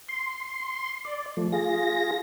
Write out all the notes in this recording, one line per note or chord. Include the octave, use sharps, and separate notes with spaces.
C6
D5
F3 A3
F4 G#4 A#6